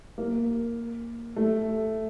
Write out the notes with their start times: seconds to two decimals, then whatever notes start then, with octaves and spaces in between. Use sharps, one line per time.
0.18 A#3
1.36 A3